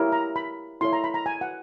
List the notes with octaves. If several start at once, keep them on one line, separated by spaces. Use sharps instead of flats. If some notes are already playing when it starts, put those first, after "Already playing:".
Already playing: E4 G4 A#4 C#5
A#5
B5
E4 A4 C#5 C6
A#5
B5
A#5
G#5
F#5